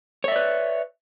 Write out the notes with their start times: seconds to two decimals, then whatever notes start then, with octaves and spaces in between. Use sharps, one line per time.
0.24 C#5
0.28 E5
0.32 D5
0.36 B4